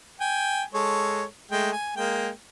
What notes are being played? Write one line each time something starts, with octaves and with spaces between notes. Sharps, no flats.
G5 G#5
G#3 A4 C#5
G#3 A3 G5
G#5
G#3 A#3 G5